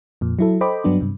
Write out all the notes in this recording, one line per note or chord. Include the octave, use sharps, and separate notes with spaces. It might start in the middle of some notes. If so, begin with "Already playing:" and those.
F2 A#2
F#3 E4 A4
A4 C5 D#5 G5 B5 D6
G2 F#3 B3 D4
G2 C3